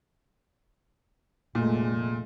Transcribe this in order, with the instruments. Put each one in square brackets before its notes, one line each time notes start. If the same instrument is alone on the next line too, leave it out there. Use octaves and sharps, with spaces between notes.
[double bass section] F1 G#3 A3 [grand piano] A#2